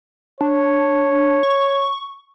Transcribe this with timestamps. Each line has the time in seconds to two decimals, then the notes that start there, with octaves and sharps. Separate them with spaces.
0.41 D4 C#5
1.43 C#6